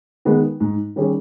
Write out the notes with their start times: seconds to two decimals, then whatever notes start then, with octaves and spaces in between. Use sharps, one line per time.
0.25 D#3 G#3 B3
0.60 G#2
0.96 D#3 G3 C#4 G#4